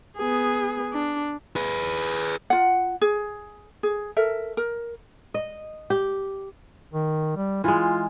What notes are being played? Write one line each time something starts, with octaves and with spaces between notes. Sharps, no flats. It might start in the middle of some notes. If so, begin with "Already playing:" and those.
B3 G#4
D4
G#4 B4
F4 F#5
G#4
G#4
A4 A#4 E5
A#4
D#5
G4
D#3
G3
E3 G#3 F4